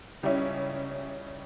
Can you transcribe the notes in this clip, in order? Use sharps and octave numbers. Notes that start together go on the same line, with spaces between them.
C#2 C#3 G3 C#4 E4